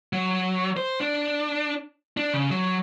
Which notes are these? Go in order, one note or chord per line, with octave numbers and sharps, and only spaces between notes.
F#3
C5
D4
D4
C#3
F#3